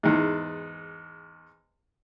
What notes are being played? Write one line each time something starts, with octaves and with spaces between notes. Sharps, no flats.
E2 G#2